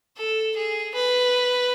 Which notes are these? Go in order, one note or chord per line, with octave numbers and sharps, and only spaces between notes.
A4
G#4
B4